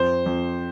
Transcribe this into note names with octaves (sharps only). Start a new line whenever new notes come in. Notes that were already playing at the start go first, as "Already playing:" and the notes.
Already playing: F2 C5
F2